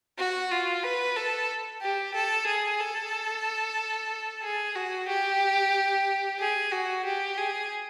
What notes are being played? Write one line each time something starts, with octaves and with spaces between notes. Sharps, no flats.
F#4
F4
B4
A4
G4
A4
G#4
A4
G#4
F#4
G4
G#4
F#4
G4
G#4